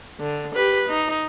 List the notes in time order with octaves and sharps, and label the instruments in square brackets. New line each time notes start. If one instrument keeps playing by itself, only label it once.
[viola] D3
G4 B4
D#4